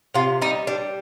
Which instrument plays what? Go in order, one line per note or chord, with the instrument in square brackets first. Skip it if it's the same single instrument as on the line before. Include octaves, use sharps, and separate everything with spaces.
[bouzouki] C3 F4
G3 D#4
G3 D4